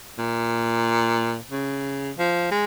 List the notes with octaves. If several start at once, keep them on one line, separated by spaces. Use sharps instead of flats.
A#2
C#3
F3
G#3